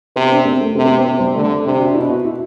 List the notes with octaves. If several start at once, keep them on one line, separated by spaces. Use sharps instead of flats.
C3 B3
D4
C4
A3
C3 C4
B3
C4
C3 B3
G3
D3 A3
C3 D4
F#4
D4
B2 E4
F#4
E4